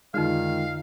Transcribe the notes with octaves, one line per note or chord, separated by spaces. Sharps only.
F2 D3 D#3 G#3 F4 F5